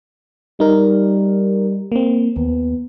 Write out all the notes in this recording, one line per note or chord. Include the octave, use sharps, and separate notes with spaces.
G3 D#4 A#4
A#3 C4
D#2 B3